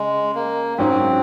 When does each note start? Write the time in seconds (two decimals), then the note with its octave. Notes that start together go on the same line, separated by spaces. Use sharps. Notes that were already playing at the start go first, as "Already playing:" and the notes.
Already playing: C#3 G#3
0.35 A#3
0.78 G#2 F#3 C4 C#4